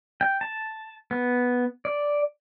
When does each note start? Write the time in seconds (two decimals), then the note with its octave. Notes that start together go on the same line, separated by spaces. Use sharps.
0.21 G5
0.41 A5
1.11 B3
1.85 D5